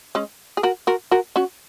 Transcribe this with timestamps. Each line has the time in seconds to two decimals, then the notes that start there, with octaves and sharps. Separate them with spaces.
0.15 G#3 C#4
0.57 G#4
0.63 F#4 A#4
0.87 F#4 A#4
1.11 F#4 A#4
1.36 C#4 F#4